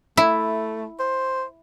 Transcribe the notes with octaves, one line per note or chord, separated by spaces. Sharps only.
A3 E4
C5